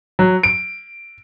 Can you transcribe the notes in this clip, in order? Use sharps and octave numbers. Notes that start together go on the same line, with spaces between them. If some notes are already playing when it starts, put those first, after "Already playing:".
F#3
D7